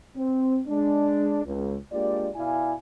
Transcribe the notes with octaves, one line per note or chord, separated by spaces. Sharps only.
C4
G#3 D4
C#2
G#3 A#3 D4 F4 G4 D5
B2 E4 D5 F5 G#5